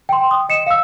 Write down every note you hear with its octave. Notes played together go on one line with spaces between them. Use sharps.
G5 C6
D#6
D#5 C#7 E7
F5 E6